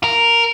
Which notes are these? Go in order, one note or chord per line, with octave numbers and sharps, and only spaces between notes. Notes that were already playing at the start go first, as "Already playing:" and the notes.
A#4